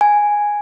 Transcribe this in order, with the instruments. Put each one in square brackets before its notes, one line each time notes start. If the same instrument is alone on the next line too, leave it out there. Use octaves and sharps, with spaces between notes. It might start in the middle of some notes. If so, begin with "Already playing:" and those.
[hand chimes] G#5